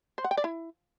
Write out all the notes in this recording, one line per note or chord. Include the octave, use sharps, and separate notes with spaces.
C5
F#5
G5
D5
E4